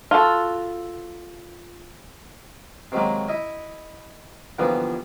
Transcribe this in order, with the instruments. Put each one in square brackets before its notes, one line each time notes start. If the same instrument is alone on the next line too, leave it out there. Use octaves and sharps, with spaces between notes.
[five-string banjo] F4 F#4 A4
[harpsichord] C3 D#3 F#3 G#3 A#3
E4 D#5
A#2 D3 E3 F3 G3 B3